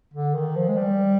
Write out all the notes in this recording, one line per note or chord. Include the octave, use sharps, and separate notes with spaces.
D3
D#3
F3
G#3
G3